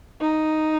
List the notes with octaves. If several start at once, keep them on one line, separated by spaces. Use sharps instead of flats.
D#4